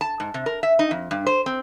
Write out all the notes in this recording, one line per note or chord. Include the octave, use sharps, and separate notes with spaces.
A5
G#2
C3
A#4
E5
D#4
F2
G2
C5
C4